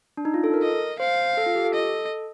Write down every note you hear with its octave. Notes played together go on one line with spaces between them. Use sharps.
D4
D#4
F4
A4
A#4
D#5
C5 F5
A4
F4
G4
A4
D#5